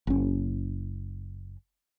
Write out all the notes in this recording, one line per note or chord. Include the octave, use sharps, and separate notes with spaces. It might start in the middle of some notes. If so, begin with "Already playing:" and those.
F#1 C#4